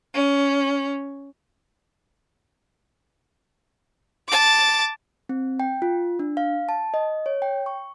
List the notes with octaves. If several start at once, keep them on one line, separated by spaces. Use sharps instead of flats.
C#4
A5 D6
C4
G5
F4
D4
F5
A5
D#5
C#5
G5
C#6